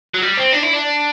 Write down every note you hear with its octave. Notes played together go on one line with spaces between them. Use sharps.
F#3
G3
C4
D4
E4
D4